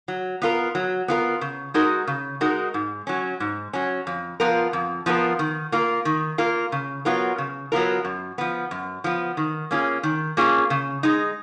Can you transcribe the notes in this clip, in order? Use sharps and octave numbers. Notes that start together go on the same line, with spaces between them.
F#3
B3 F4 A#4
F#3
B3 F4 A#4
C#3
G#3 D#4 F#4 A#4
C#3
G#3 D#4 F#4 A#4
G#2
F#3 C#4
G#2
F#3 C#4
F2
F3 B3 F4 A#4
F2
F3 B3 F4 A#4
D#3
A#3 F4 A#4
D#3
A#3 F4 A#4
C#3
F#3 B3 F4 A#4
C#3
F#3 B3 F4 A#4
F#2
F3 B3
F#2
F3 B3
D#3
A#3 C#4 F4 G#4
D#3
A#3 C#4 F4 G#4
C#3
G#3 D#4